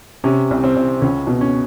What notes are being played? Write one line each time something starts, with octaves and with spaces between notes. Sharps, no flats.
C3 C#4
C2
C4
C2
C#2 C#4
B2
C#4